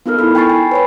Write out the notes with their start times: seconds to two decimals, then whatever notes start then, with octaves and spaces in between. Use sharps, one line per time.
0.06 B3 D#4 F4 A4 A#4 F6
0.19 E4 B5 E6
0.35 G5 G#5 B5 C#6 A6 C7
0.50 G#5
0.71 B4 C#5 B5